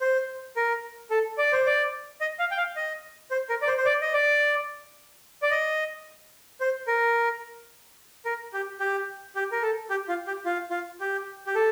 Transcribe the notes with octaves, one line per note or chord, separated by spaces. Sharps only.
C5
A#4
A4
D5
C5
D5
D#5
F5
G5
F5
D#5
C5
A#4
D5
C5
C5
D5
D#5
D5
D5
D#5
C5
A#4
A#4
G4
G4
G4
A#4
A4
G4
F4
G4
F4
F4
G4
G4
A4